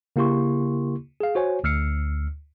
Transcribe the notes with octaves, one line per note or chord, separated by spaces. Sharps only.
C#3 A#3 E4 G4 C6 C#6
G#4 F5
F#4 C5 C#5 G#5
D2 E6 F6 C7 C#7